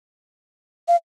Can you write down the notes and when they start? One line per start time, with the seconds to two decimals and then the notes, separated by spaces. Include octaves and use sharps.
0.88 F5